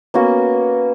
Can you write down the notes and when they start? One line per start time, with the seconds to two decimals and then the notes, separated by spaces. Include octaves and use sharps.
0.14 A#3 B3 C#4 F#4